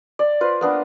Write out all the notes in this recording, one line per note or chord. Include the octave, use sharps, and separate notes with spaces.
D5
F4 B4 C5
A#3 B3 D4